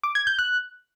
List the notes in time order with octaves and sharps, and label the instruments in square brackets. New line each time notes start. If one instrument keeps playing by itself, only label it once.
[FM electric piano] D6
G#6
G6
F#6